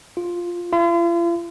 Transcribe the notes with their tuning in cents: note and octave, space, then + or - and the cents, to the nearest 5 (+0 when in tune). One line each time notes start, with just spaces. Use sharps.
F4 +0
F4 -45